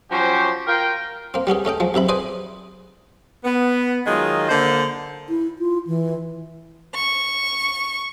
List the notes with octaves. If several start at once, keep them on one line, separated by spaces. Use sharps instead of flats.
F3 F#3 C#4 F#4 G4 C5
F4 A#4 G5
A#3 C4
G3 B3 C#4 G#4
A3 C#4 D#5 G5
F3 G#3
B1 C3 E5 B5
G#4 B4 C5 D5 D#5 G#5
B3
D#3 F#3 G#3 F4
D3 A#3 C5
E4
F4
E3
C#6